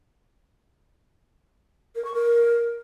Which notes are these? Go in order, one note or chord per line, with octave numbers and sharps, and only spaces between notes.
A#4
C#6
A#4